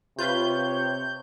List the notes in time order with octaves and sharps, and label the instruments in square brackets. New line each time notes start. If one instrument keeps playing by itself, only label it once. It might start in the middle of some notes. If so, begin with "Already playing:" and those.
[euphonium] C3 [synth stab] F4 B4 [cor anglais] C#5 [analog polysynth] G6